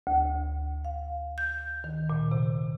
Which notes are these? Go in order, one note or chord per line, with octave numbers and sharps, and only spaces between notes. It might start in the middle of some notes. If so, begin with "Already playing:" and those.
D2
F5
G6
D#3
A#2
C3